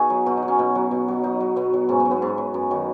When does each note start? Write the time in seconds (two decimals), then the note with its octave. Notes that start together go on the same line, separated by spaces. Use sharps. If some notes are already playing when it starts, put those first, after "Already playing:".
Already playing: B2 D#4 F#4 G#4
0.10 F#3
0.26 B2 F#4
0.37 D#4
0.42 F#3
0.48 C#4
0.59 B2 B3
0.75 F#3
0.91 B2
1.08 F#3
1.24 B2 D#4
1.40 F#3
1.56 B2 B3
1.73 F#3
1.89 G#2 C#4
2.00 B3
2.05 F#3
2.11 B3
2.22 G#2
2.38 F#3
2.54 F#2
2.71 D#3 F#3